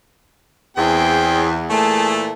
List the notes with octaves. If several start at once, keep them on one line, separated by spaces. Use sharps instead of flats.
E2 C4 G#4 G5
A#2 E3 A3 G#4 A5